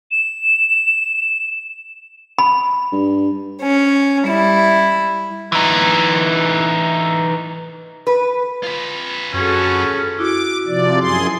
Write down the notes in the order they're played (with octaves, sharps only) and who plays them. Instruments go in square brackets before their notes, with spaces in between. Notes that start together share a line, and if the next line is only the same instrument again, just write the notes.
[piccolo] E7
[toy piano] B5
[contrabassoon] G2
[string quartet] C#4
G3 E4
[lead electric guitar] E3 D#4
[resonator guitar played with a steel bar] B4
[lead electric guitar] F4 B4
[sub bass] F#2 [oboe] C#4 [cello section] F#4 G#4 A4
[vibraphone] E4 F#4 [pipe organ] D6
[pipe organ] C3 F3 D5
F#2 G#4 C6